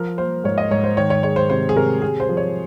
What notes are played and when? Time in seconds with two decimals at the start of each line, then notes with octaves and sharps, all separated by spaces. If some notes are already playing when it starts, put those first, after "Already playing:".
Already playing: F3 A#4
0.18 A#3 C5
0.44 G#2 C#5
0.58 D#5
0.71 G#2 C#5
0.84 C5
0.97 D#3 C#5
1.10 C#5
1.23 G#3 C#5
1.36 C5
1.50 C3 C5
1.69 G#4
1.76 C3 A#4
2.02 C3 G#4
2.20 C5
2.29 F3
2.37 C#5